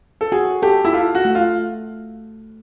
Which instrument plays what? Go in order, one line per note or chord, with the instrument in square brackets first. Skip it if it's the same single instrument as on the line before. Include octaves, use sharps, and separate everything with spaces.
[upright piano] A4
[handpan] F#4 [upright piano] G#4
[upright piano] G4 [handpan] A4
[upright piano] E4
[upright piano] F4 [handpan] A4
[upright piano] F#4
[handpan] A3
[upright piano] F4